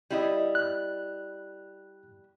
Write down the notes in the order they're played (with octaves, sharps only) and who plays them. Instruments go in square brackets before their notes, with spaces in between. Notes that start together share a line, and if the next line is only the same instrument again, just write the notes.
[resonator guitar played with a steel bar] G3 E4 D#5
[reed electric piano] F#6